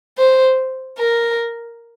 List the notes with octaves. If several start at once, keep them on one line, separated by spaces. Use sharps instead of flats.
C5
A#4